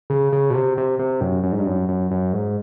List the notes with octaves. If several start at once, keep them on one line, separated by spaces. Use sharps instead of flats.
C#3
C#3
B2
C3
C3
C3
F#2
F#2
G#2
G2
F#2
F#2
F#2
G#2